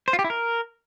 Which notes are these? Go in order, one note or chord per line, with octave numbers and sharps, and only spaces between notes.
C5
F4
G4
E4
A#4